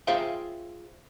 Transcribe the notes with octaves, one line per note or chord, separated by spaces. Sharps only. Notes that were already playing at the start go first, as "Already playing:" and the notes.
F4 G#4 C5 E5 F5 G5